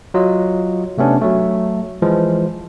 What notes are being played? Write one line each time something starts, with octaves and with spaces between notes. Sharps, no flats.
F#3 F4 D#5
C3 A3 B3 C#4 D4
F#3 A3
E3 F3 G#3